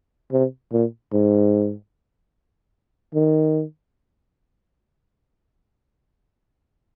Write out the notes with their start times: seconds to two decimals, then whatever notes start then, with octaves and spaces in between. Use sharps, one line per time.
0.32 C3
0.72 A#2
1.13 G#2
3.15 D#3